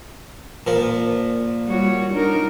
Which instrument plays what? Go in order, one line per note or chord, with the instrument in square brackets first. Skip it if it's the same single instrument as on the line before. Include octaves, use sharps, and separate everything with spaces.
[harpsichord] A#2 F3
[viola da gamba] G3 F#4 C#5
D4 D#4 A#4